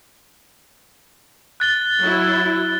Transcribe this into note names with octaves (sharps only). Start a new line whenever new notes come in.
F#6 A6 G7
F#3 E4